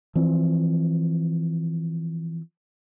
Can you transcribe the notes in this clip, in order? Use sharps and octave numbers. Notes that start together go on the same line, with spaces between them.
E3 F3 C4